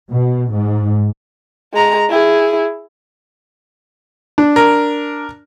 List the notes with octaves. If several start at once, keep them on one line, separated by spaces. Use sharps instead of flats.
B2
G#2
G#3 A#5
E4 G#4
D4
A#4